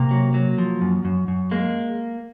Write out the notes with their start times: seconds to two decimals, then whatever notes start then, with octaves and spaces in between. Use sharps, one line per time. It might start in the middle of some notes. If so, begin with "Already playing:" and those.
Already playing: C3 A#3
0.11 F#3
0.34 F#3
0.58 F3
0.81 F#2
1.05 F#2
1.28 F#2
1.51 G#3 A#3